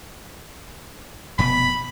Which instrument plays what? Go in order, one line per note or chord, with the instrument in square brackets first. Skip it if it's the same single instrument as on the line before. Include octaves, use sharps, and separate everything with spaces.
[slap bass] F1 B2 B3 [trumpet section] B5